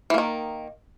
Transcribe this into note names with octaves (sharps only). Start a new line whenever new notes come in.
D#3 E3 A#3